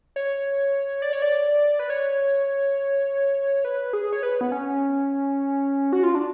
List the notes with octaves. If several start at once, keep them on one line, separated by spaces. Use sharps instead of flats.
C#5
D5
C#5
D5
B4
C#5
B4
G#4
C#5
B4
B3
C#4
F#4
F4
D4